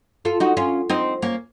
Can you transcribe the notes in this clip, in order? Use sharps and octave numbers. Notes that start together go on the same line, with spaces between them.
F4 A4
D#4 F#4
C#4 F4
C4 D#4
A#3 C#4